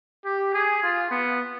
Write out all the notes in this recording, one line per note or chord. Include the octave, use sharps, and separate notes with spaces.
G4
G#4
F4
B3